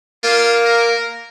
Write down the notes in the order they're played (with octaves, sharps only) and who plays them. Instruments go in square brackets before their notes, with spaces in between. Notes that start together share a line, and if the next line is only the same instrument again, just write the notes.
[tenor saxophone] A#3 [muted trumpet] F4
[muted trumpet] A#4